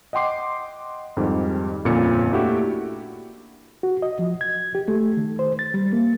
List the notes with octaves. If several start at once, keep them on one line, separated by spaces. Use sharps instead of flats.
D#5 F#5 G5 C6 D6 C7
F2 G#2 D#3 G3
G1 F2 A#2 C#4 C#7
A3 A#3 D4 E4 F#4 G4
F#4
D#5
F3
G#6
G4
A3
D#3
C5
A6
G3
A#3